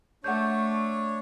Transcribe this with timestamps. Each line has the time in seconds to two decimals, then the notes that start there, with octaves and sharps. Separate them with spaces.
0.24 A3 D4 C#5 F#5 G6